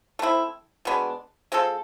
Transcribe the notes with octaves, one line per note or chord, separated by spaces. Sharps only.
A3 C4 E4
B2 G#3 B3 D4
G#3 C4 F4 A4